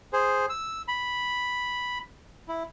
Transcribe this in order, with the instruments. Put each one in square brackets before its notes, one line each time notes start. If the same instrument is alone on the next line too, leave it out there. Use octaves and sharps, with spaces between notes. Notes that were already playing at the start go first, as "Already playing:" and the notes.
[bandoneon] G#4 C5
E6
B5
E4